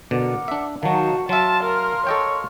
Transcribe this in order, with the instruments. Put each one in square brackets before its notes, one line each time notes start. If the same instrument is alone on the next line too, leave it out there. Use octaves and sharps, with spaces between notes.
[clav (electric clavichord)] B2 D3 [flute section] A#4 F#5 D6
[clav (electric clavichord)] D4 E5
[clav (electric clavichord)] D#3 F#3 [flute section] D#4 F5 A5 [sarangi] F#4
[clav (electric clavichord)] F#3 E5 [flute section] F5 C6 F6 [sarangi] A5
[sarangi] A#4
[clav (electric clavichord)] A4 D#5 G5 [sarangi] C#5